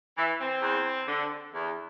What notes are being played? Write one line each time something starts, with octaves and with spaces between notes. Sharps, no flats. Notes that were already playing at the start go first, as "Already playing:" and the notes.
E3 E4
C4
E2
D3
E2